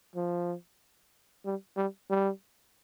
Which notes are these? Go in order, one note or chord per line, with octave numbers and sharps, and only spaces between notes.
F3
G3
G3
G3